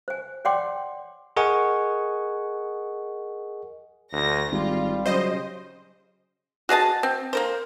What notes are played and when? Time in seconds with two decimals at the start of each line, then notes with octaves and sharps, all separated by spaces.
0.08 C5 G#5
0.45 C#5 D5 F#5 G5 C6 D6
1.37 G#4 A#4 D#5 F#5 G#5 C#6
4.13 D2 A#6
4.52 G#1 G3 F4
5.06 C#3 F#3 C5 D#5
6.69 F#4 G#4 D#5 A5
7.03 C4
7.33 A#3 A#4 C5